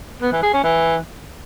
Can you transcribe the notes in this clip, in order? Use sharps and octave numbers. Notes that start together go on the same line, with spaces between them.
B3
E3
G#4
C#4
E3